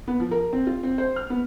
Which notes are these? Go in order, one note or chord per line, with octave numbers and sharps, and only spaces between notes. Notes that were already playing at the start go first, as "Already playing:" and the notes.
B3
F3
A#4
C4
F4
C4
C5
F6
B3